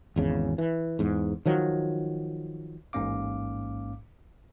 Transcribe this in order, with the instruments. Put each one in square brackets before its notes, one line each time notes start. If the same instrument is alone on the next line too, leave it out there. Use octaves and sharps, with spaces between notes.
[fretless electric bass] G#1 E2 C#3
E3
E2 G#2
D#3 F3 F#3
[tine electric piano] A1 G#2 A#3 C#4 F5 D6